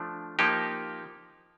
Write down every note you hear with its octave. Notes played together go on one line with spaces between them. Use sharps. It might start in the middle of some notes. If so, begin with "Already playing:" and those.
Already playing: F3 A3 D4
F3 A#3 D#4 G4